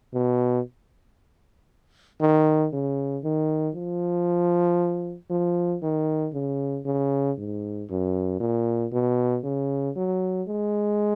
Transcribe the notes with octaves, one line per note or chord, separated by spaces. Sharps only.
B2
D#3
C#3
D#3
F3
F3
D#3
C#3
C#3
G#2
F#2
A#2
B2
C#3
F#3
G#3